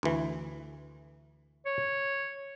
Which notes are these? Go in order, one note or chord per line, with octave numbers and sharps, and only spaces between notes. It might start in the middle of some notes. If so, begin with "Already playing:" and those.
D2 E3
C#5